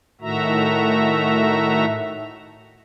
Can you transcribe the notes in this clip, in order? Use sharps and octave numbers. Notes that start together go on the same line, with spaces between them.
A2 D#3 A3 F#4 E5 A#5